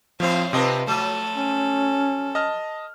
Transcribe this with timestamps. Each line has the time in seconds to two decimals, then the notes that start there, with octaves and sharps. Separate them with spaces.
0.20 A2 F3 A3 C4 C5 F5
0.53 C3 C4 D#4 F4 B4 D#5 A5
0.87 F3 F#3 A3 A4
1.37 C#4
2.35 D#5 A5 F6